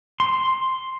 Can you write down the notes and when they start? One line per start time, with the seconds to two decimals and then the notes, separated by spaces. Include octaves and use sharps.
0.20 C6